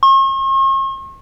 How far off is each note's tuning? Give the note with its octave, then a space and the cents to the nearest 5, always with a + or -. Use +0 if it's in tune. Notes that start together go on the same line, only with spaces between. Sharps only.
C#6 -45